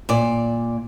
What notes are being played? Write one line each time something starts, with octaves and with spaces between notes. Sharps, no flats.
A#2 D5